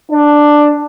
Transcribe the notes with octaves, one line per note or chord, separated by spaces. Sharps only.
D4